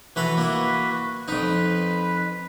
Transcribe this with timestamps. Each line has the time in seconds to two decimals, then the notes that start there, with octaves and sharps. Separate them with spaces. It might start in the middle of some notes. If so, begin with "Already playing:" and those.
0.16 E3 F#4 A4 B4 B5
0.37 A#3 E4
1.28 F2 D#4 B4